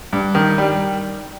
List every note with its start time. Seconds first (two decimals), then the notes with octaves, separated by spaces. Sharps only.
0.13 G2
0.35 D#3
0.58 G3